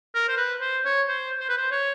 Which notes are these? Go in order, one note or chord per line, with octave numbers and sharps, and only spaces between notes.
A#4
C5
B4
C5
C#5
C5
C5
B4
C5
C#5